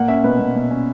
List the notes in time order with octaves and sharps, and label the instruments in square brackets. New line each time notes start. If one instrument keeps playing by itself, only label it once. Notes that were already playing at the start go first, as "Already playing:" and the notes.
Already playing: [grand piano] A#2 A#3 F#5
C#4 E5
B2 B4
B2
B2
C#4